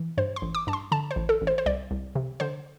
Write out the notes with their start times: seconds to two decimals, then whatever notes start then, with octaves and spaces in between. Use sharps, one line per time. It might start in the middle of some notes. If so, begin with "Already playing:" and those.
Already playing: E3
0.18 G2 C5
0.36 C6
0.42 A1
0.55 D6
0.67 G2 A5
0.73 C6
0.92 D3 A5
1.11 C5
1.16 A1
1.29 A4
1.41 A1
1.47 C5
1.58 C5
1.66 C2 D5
1.91 C2
2.15 C3
2.40 D3 C5